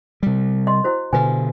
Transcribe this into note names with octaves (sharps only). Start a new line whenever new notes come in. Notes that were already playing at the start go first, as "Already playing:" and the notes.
C3 G3
D#5 C6
E4 F#4 C5
B2 D3 B4 G#5